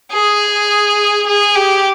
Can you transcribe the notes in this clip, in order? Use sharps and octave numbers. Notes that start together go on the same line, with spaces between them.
G#4
G#4
G4